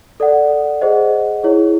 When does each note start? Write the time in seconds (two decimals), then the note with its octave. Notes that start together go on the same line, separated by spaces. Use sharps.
0.20 A4 D5 F#5
0.81 G#4 C5 D#5 F#5
1.43 E4 G#4 C#5